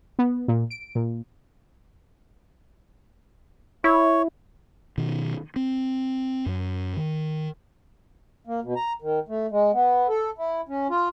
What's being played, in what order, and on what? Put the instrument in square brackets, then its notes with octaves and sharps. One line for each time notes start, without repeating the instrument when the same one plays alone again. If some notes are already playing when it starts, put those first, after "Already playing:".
[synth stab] B3
A#2
D7
A#2
[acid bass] E4 [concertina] C#5
[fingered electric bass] B2 D#3
C4
F#2 F#3
D#3
[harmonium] A#3
B2
A#5
D#3
A3
G#3
B3
A4
E4
C#4
F4